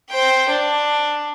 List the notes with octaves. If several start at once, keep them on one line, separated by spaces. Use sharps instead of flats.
C5 G5
D4